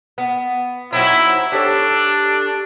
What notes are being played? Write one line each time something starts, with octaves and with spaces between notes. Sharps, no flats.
B3
F#3 C4 D#4 E4
D4 G4 A4 C#5